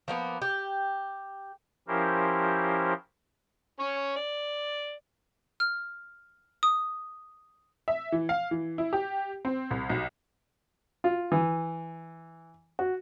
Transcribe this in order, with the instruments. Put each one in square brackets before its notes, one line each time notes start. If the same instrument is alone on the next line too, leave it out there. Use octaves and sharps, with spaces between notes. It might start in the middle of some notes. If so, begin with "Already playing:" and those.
[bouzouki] F3 A#3 B3
G4
[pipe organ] F3 C#4 E4 G4 A#4 C5
[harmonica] C#4 C#5
D5
[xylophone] F6
D#6
[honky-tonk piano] E5
E3
F5
E3
E4
G4
C4
C2
B1
[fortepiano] F4
E3
F#4